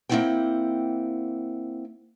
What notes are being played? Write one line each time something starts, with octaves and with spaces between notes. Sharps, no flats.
A#3 C4 C#4 E4 F#5 G5